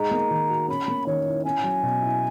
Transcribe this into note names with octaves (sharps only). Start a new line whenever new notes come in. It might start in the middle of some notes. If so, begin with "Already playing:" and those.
Already playing: G#3 D#4 A#5
A#3
D#3
F#4
C#4 B5
A#3
D#3 C#5
E4
C#4 G#5
F#3
B2
E4